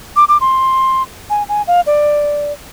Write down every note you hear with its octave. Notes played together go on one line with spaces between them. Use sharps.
D6
D6
C6
G#5
G#5
F5
D5